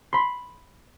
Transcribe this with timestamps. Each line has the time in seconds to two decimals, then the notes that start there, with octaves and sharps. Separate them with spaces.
0.13 B5 C6